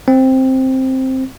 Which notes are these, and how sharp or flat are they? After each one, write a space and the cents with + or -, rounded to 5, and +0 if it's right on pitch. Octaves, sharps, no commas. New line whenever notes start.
C4 +5